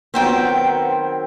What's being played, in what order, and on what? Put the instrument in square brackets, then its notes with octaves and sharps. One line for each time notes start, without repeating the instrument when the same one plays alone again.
[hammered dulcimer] D#3 F#3 C4 [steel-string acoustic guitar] B3 C5 G5